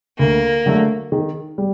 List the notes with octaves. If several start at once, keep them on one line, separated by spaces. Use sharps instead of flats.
D2 A#3
D3 F#3 A3
D#3
G3